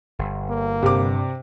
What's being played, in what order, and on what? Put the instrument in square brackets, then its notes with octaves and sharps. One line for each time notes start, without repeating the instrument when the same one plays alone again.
[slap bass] G1
[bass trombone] A#3
[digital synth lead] G2 [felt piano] C3 D6